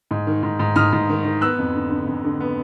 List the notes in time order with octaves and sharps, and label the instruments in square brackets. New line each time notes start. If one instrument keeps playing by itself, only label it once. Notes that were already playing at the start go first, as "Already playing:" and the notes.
[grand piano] G#2
D#3
G#2
G#2
G#2 D#6 F6
G#2
D#3
D#3
B3 E6 F#6
F2
D3
D3
F2
D3
B3